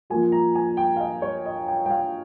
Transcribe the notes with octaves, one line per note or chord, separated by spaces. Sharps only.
F3 A#3 F4 G#5
A#5
G#5
G5
F5
D#5
C#5
D#5
G5
G5
F5